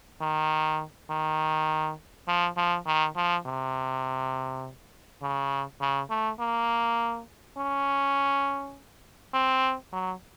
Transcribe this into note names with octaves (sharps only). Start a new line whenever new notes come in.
D#3
D#3
F3
F3
D#3
F3
C3
C#3
C#3
A3
A#3
C#4
C4
F#3